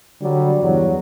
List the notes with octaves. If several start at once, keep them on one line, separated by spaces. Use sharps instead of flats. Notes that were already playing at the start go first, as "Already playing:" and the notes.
D3 F#3 G3
E2 G2 F#3